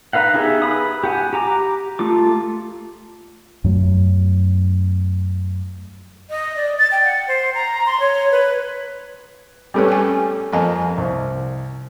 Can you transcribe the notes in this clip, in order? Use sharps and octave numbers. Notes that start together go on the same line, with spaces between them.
D#4 B4 F5 F#5
B3 D#4 G4 G#4 E5
B4 B5 D#6
G4 F#5 G#5
G4 A#5 D6
A3 F4 D6
F#2 F#3 A3
D#5
D5
A6
G5
F#5
C5
A#5
C6
C#5
B4
G3 A3 C4 C#4 G4 B4
G5 G#5
F2 A#3 D#5 G#5 A5
C2